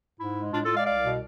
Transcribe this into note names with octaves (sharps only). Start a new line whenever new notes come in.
G#2 E4
G#3
A2 D4 F4
F4 A4
G#3
D5 F5
C2 D5 F5
B2